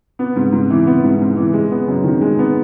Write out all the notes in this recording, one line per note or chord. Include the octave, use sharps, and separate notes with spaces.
B3
G#2
G#2
E3
B3
G#2
G#2
E3
G#3
B3
F#2
D#3
G#3
B3